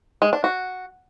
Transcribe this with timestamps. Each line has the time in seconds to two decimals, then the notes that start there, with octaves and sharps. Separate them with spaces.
0.22 G#3
0.33 D4
0.44 F#4